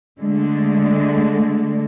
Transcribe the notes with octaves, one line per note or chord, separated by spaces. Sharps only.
D3 G#3 A3